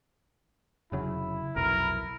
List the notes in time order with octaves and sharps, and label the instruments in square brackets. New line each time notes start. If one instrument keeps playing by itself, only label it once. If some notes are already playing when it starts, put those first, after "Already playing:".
[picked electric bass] F1 C#3 F#3 [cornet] E4
[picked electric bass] F1 B1 [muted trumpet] A#4